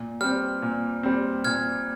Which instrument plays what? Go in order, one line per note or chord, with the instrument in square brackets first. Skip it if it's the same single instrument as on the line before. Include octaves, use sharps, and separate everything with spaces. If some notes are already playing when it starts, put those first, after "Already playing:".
Already playing: [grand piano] A#2
[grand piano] G3 C4 [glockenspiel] F6
[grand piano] A#2
G3 C4
[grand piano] A#2 [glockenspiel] F6 G#6